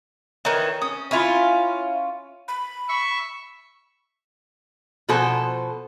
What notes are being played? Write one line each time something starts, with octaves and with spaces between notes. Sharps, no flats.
D#3 E3 C#5 A#5
C#4 D#6
C#4 E4 F4 G#5 B5
B5
E5 C#6
B2 F3 F#4 A4 C5 G#5